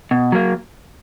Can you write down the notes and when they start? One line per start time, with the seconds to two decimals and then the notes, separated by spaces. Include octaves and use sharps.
0.11 B2
0.32 F#3 A#3